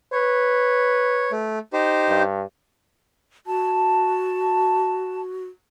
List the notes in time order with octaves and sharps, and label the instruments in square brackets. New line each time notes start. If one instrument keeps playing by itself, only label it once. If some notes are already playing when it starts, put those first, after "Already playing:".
[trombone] B4 [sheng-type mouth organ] C#5
[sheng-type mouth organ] A3
D#4 G4 C5
[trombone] G2
[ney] F#4 [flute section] A5